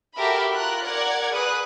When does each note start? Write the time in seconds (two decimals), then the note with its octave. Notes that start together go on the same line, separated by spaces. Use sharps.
0.17 F#4 G4 A4 A#4 E5 B5
0.53 F4 A#4 F#6
0.84 A#4 D5 F#5 G#6
1.34 G#4 B4 D#6 F#6